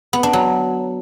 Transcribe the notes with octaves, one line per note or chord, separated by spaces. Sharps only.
B3
D4
F#3